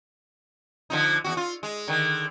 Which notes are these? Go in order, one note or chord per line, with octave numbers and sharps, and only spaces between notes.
D3 F3 D#4
E2 F#4
F4
G#3
D3 D#3